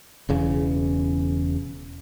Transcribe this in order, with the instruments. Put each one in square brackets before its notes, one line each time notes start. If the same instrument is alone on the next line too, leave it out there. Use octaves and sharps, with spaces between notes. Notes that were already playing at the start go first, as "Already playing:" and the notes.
[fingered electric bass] E1 E2 C#3